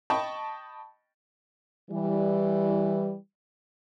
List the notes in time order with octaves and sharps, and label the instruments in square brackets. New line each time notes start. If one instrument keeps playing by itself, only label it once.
[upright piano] D#5 G5 A5 B5 C#6
[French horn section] E3 G3